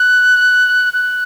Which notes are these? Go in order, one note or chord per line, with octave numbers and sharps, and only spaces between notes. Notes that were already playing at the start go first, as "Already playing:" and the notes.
Already playing: F#6
F#6